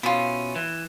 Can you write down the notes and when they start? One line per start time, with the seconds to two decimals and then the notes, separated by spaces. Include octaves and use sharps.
0.03 B2 C#4 E4 F4
0.55 E3